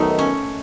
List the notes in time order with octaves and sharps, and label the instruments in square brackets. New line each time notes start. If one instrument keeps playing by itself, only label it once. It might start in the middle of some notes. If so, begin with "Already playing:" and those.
Already playing: [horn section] D#3 F#3 B3 D#4 [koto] A3
[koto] C#4